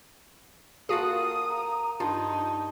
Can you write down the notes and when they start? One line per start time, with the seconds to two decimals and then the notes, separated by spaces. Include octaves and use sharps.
0.89 A#3 F4 F#4 G#4 A4 F5 F#5 D#6
1.49 A#5
2.00 G2 D#4 F4 A5